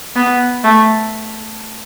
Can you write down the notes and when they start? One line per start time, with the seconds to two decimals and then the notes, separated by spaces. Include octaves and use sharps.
0.15 B3
0.64 A3